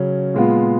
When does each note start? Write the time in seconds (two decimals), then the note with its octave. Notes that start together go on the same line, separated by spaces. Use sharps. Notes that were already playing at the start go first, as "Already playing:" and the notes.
Already playing: C#3 F#3 C#4
0.34 A#2 G#3 B3 F4